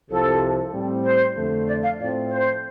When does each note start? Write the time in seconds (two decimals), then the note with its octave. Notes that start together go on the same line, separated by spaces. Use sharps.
0.10 C2 C3 F3 A4
0.72 A2 G3 C4
1.04 C5
1.35 F2 D3 A3
1.66 D5
1.82 F5
1.98 A2 F3 A3 C4 D5
2.30 C5